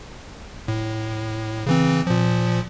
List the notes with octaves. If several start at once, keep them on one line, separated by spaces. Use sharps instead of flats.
A2
C#3 E3 C4
A#2 F3